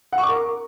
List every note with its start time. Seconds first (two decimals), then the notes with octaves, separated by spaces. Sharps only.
0.13 F#5
0.18 C#6
0.23 D6
0.29 A#4